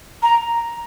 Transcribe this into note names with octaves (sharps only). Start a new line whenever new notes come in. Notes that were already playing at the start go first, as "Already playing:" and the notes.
A#5